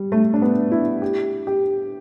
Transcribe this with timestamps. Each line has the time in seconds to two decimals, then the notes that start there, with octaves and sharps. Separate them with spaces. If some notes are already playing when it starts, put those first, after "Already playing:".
Already playing: G3
0.12 A3
0.34 D4
0.42 B3
0.72 E4
1.02 G4
1.47 G4